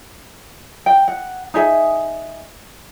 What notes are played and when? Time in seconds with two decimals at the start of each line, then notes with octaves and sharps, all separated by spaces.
0.86 G5
1.08 F#5
1.54 D#4 G#4 E5 G#5